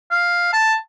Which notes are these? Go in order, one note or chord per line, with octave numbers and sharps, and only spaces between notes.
F5
A5